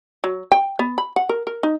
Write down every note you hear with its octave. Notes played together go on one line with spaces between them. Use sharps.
F#3
G5
B3
B5
F#5
A#4
A#4
D#4